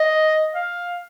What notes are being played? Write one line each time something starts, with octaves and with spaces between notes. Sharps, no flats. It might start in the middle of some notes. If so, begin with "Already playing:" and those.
Already playing: D#5
F5